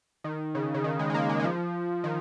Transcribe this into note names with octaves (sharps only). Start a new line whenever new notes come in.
D#3
C#3
C#3
D#3
G#3
G#3
A#3
G#3
G#3
F3
D#3